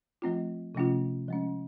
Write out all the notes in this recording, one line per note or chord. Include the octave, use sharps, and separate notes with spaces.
F3 A3 C4 F4
C3 F3 A3 C#4 F4
F3 G#3 C#4